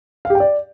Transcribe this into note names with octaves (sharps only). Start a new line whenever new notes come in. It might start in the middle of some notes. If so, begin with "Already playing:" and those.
F5
G4
G5
D5